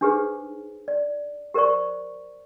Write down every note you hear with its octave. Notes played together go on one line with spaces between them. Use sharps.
D4 D#4 G4 G#4 B4 C5
D5
G4 A#4 C5 D5 C#6